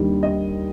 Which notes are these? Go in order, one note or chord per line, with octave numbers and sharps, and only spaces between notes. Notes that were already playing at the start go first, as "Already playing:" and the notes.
Already playing: D#2 D3 G3
D#5